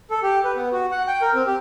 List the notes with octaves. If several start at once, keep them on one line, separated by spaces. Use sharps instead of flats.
A4
G4
B4
B3
F#4
F#5
G5
A#4
C4
G4